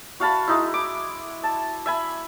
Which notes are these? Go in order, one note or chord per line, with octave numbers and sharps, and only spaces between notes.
F#4 F5 A5 B5
G#3 D#4 E4
D6
A5
E5 G#5 B5